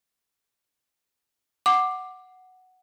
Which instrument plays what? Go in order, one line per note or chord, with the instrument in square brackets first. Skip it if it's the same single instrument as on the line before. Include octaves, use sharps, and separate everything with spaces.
[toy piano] F#5 [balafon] D6